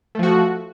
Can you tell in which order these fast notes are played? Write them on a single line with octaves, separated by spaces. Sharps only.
A3 F3 F#4